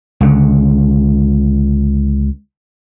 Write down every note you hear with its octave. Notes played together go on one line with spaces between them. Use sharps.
C#2 D3